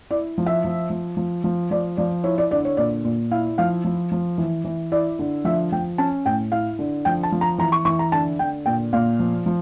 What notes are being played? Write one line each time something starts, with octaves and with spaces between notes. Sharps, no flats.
E4 D5
F3
E5
F3
F3
F3
F3
F3 D5
F3 D5
E4 C#5
D5
D3 D5
C#5
A#2 D5
A#2
E4 F5
F3 F5
F3
F3
E3
E3
E4 D5
D3
F3 E5
F3 G5
C#4 A5
A2 G5
E4 F5
D3
F3 G5
A5
F3
A#5
E3 A#5
C#6
E3 C#6
A#5
D3 A5
D3 G5
A#2 G5
A#2 F5
F3
F3